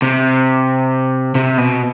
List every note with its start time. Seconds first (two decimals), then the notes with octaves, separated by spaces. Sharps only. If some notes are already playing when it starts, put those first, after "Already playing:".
0.02 C3
1.35 C3
1.58 B2